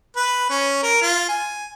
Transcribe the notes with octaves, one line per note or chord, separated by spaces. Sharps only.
B4
C#4
A#4
F4
G#5